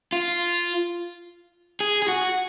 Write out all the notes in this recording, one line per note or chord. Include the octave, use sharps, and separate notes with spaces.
F4
G#4
G#4
F#4